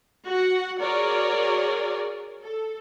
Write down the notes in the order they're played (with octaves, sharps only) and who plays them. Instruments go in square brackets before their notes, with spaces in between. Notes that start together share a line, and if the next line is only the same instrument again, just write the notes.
[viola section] F#4 F#5
F#4 G#4 A#4 C#5 D5
A4